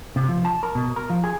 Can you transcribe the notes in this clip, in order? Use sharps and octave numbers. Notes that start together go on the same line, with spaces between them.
C3
F3
A5
A#4
B2
A#4
F3
G#4